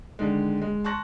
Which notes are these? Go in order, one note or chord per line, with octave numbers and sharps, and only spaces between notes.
D3 D#3 G#3
G#3
A5 C6 C#6 F#6 A#6